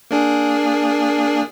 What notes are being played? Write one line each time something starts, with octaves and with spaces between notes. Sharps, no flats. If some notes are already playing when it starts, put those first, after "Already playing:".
A#3 D4 G#4